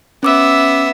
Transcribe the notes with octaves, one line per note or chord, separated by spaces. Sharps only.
B3 C#4 E5 D6 E6